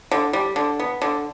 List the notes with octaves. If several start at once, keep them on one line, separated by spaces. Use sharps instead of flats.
D3
G3
D3
B3
D3